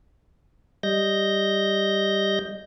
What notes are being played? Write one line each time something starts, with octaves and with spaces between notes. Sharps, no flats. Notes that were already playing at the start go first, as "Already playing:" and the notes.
G3 D#5 G6 A#6